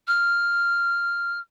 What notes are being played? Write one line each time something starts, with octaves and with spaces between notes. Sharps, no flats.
F6